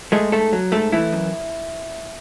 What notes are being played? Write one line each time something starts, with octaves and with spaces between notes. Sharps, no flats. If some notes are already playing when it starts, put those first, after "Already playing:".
G#3 A3 G#4
G#2 A3 A4
F#3
G#2 A3 A4
E3 A3 E4
F#2